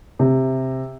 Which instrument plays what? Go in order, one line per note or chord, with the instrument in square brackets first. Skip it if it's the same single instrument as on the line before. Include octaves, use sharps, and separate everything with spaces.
[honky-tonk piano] C3